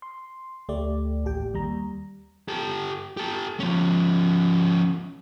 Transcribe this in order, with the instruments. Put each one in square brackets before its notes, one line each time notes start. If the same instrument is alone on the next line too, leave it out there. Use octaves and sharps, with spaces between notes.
[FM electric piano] C6
D2 A3 G4 D5
A1 D#2 G4 G5
D#2 G3 A#5
[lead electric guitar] G4 A4
G4 A4
F3 C#4